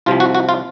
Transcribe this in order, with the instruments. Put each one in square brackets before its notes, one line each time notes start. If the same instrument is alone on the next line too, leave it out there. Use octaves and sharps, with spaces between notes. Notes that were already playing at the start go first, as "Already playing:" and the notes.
[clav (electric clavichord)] C2 C3 F3 F4
F#4
F#4
F4